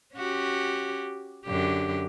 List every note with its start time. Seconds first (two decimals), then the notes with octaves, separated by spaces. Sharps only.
0.16 C#4 F#4 G4
1.47 F#2 D3 G4